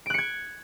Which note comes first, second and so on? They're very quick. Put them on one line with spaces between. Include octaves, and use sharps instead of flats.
D7 F#6 C#7 G#6